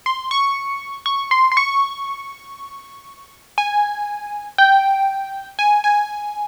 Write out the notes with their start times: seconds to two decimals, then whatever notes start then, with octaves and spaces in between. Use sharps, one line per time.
0.06 C6
0.31 C#6
1.06 C#6
1.31 C6
1.52 C6
1.57 C#6
3.58 G#5
4.58 G5
5.59 G#5
5.84 G#5